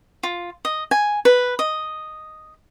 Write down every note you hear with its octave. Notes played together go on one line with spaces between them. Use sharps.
F4
D#5
G#5
B4
D#5